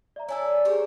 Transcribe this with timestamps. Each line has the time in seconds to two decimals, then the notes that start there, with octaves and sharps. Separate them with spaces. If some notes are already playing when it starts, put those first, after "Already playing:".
0.16 D5 E5 A#5
0.29 E4 A4 C#5 D5 G#5 E6
0.65 G4 G#4 A#4 C5 C#5